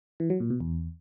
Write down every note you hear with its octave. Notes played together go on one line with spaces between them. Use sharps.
E3
F#3
A#2
B2
E2